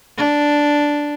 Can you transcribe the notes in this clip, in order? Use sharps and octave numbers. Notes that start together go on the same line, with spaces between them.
D4